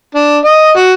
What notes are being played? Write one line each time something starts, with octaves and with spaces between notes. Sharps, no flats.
D4
D#5
F#4